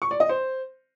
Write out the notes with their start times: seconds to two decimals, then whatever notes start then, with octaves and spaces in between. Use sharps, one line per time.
0.02 C#6
0.11 D5
0.20 D#5
0.29 C5